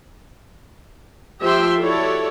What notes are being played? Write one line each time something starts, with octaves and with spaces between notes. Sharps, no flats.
F3 G4 E5 G5 C6
E4 F#4 G4 A4 C#5 D5